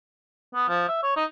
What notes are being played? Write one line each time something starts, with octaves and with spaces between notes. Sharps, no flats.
B3
F3
E5
C#5
D#4